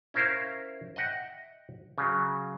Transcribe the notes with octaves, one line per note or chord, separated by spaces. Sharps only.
C#4 E4 A#4 C5 F5
D#5 E5 F#5 G5
C#3 F#3